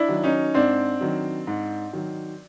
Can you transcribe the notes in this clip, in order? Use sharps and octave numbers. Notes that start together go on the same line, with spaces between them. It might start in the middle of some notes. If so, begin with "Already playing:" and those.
Already playing: D4 E4
D#3 F#3
C#4 D#4
G#2 C4 D4
D#3 F#3
G#2
D#3 F#3